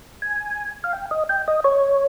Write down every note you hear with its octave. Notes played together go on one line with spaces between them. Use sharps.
G#5
F5
G5
D#5
G5
D#5
C#5